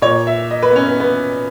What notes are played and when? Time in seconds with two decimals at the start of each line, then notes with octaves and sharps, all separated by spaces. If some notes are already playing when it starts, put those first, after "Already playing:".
0.02 A#2 C#5
0.27 E5
0.51 D#5
0.63 B4
0.70 B3
0.76 C#4
0.87 B3
1.00 B3